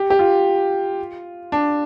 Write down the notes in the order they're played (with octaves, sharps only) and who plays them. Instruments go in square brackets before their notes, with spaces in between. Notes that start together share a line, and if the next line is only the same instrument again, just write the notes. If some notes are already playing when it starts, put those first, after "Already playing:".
Already playing: [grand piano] G4
G4
F4
D4